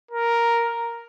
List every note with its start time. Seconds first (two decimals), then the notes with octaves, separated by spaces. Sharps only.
0.11 A#4